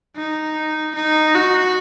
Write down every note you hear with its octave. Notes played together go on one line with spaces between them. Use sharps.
D#4
D#4
F#4